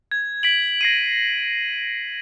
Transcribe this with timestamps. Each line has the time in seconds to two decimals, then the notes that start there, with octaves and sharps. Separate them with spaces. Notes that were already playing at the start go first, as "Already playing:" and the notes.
0.11 G#6
0.43 B6 D7 F#7
0.81 A#6 C7 D#7